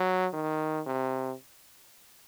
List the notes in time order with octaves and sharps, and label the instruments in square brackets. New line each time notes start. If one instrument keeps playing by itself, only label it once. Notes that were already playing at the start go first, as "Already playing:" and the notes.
Already playing: [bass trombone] F#3
D#3
C3